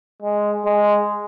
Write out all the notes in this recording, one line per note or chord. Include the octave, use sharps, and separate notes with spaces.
G#3
G#3